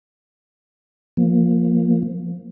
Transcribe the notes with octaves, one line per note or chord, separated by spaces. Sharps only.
F3 A#3